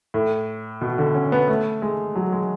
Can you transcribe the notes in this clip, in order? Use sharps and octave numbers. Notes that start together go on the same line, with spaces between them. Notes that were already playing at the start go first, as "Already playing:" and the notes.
A2
B2
D3
C#4
B3
A3
G#3
F#3
G#3